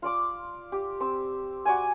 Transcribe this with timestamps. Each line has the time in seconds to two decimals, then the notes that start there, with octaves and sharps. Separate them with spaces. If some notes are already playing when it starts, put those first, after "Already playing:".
0.02 F4 D5 D6
0.72 G4
1.00 C4 E6
1.65 F#4 D5 G#5